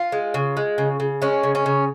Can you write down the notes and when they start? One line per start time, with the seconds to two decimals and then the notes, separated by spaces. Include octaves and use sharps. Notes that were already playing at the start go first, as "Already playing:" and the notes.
Already playing: F4
0.12 G#3
0.34 C#3
0.57 G#3
0.78 C#3
1.00 C#3
1.22 G#3 C#4
1.43 C#3
1.55 C#4
1.66 C#3